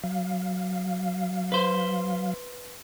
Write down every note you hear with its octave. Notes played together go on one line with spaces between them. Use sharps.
F#3 F5
B4 C5